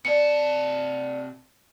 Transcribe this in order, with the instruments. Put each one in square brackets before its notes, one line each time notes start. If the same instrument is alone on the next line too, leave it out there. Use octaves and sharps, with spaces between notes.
[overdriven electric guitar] C3 A5 [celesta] D5 C#7